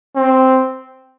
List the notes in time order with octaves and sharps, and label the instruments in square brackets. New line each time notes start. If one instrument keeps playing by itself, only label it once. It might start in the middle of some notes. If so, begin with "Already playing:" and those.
[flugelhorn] C4